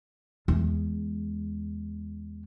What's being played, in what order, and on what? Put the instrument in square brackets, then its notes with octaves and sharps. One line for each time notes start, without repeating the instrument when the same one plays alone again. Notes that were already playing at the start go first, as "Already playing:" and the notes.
[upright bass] E2 G#3